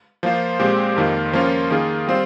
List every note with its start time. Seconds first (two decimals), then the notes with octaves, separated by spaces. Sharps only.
0.23 F3 A#3 F4 C5
0.59 A#2 G#3 C4 G4 C5
0.96 F2 D#3 A#3 F4
1.33 F3 A#3 C#4 F4 A#4
1.70 D#3 A#3 F4 G#4
2.07 G3 C4 F4 C5